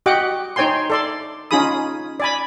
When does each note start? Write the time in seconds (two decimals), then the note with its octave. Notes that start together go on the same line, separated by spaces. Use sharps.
0.06 F#4 G4 D#5 F#5 G5 D6
0.56 D#4 C5 C#5 G5 G#5 C6
0.90 A4 D5 C6
1.51 C#4 D#4 F4 G#4 B5 D#6
2.20 D5 G#5 B5